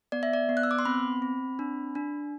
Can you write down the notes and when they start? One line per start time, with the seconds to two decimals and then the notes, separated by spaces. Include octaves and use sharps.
0.12 B3 D5
0.23 E5
0.33 D5
0.49 B3
0.57 F#6
0.63 E6
0.71 D6
0.79 C6
0.85 C4 B5
1.22 C4
1.59 D4
1.95 D4